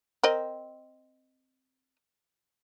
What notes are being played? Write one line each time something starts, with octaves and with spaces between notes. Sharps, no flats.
C4 A#4 D#5